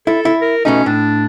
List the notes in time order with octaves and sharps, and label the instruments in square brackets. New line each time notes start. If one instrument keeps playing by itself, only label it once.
[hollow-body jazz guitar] E4 [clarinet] A4
[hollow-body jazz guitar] E4
[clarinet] A#4
[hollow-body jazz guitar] B2 A3 D#4 [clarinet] C#4
[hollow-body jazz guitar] A2 [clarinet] D4